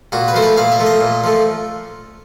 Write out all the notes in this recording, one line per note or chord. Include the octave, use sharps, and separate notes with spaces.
A#2 F#4
B4
F3 A3 C5
B4
A#2 F5
E5
F3 A3
D#5
A#2
F3 A3